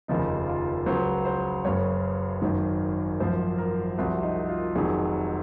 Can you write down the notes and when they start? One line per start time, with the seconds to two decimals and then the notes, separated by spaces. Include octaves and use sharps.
0.08 F1 D#2 C#3 F3 D#4
0.47 F4
0.86 C#2 C#3 F#3 C5
1.25 C5
1.65 F#1 F#2 C#3 C#5
2.42 G#1 F#2 D#3
3.20 G#1 F#2 F3 C5
3.58 A#4
3.97 C2 C3 F3 F#4
4.23 D#4
4.49 F4
4.75 F1 F2 D#3 F#3 G#4